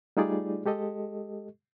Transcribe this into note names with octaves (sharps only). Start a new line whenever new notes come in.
G3 A3 D#4 F4 G#4 D5
G#3 G4 A4 D#5